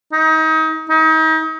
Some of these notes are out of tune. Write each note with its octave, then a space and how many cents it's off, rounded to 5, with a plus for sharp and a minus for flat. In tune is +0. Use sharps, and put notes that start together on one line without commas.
D#4 +30
D#4 +35